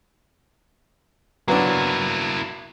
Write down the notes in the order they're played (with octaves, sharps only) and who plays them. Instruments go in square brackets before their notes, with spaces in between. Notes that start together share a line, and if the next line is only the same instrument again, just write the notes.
[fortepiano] F#3 B3 D4 [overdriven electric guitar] A#3 E4